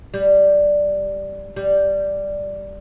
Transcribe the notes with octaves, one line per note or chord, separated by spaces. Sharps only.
G3
G3